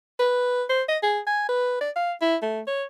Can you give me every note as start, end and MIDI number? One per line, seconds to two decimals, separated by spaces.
0.19 0.63 71
0.70 0.82 72
0.88 0.98 75
1.03 1.19 68
1.26 1.46 80
1.49 1.78 71
1.81 1.90 74
1.96 2.12 77
2.21 2.36 64
2.42 2.60 57
2.67 2.84 73